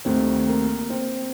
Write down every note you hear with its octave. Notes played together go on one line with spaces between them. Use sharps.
D2 C3 D#3 G3 C4
A#3
C4